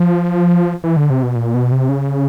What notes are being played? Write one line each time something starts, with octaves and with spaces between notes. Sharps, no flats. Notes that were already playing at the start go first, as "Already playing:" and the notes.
Already playing: F3
E3
D3
C3
B2
A#2
B2
C3
C#3